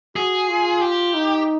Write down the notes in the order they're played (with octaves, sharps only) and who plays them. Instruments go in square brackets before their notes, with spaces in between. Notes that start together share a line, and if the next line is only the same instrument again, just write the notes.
[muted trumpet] F#4 [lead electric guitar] G#4
[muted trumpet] F4
[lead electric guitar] G4
[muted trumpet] D#4